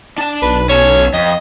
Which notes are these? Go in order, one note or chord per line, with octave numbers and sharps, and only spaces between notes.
D4 A5
B1 B4
C#4 A4 C#5
F2 D#5